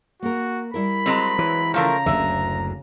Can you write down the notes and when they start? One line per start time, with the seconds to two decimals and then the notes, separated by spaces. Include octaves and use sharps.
0.22 A#3 F#4 A#4
0.74 G3 E4 A#4 B5
1.06 F#3 G#3 C4
1.39 E3 B4 C#5
1.74 C#3 F3 A3 A#4 F5 A5 A#5
2.06 F#1 D2 D3 E5